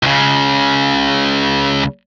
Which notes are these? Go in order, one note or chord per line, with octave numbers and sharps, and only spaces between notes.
C#2 C#3